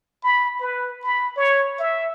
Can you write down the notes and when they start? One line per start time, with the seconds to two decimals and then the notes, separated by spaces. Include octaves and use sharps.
0.23 B5
0.61 B4
1.04 B5
1.37 C#5
1.79 E5